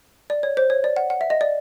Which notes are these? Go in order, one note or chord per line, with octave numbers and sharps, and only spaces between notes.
D5
C#5
C5
C#5
D5
F#5
F#5
E5
D#5
D5